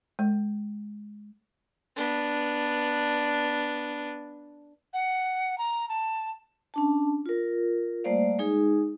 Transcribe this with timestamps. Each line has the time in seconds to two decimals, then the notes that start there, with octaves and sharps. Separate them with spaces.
0.19 G#3
1.97 B3 D4
4.94 F#5
5.58 A#5
5.89 A5
6.74 C#4 D4 A5
7.26 F4 A#4
8.04 G3 A3 A#3 C5 D5 F5
8.39 G#3 D#4 G#4